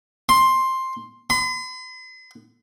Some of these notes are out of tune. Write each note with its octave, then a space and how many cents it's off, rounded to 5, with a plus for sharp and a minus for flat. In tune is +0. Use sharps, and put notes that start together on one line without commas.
C6 +10
C6 -45